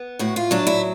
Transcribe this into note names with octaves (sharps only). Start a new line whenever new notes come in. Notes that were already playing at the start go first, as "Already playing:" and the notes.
Already playing: B3
A2 F#4
F4
F#3 D4
E4